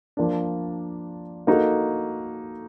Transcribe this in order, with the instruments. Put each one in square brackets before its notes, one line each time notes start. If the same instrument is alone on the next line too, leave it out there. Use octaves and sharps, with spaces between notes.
[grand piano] F3 A#3 D4
A#3 D#4 F#4 A4